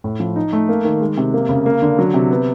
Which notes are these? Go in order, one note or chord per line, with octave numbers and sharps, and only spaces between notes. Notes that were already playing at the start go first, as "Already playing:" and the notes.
A2
F3
D#4
A3
A#3
D#3
G#3
C3
A#3
C#3
A#3
D3
F#3
C3
B3